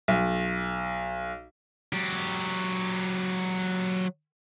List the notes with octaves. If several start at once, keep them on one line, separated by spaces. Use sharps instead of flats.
B1
F#3 G4